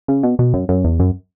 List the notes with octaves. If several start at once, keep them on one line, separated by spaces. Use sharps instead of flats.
C#3
B2
B2
F#2
F#2
E2
F#2